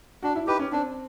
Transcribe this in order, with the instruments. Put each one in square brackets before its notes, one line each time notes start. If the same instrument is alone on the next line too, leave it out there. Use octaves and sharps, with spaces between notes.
[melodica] D4 [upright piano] F#4
[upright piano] E4
[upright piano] D#4 [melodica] G4 B4
[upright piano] C#4
[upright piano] C4 [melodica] D4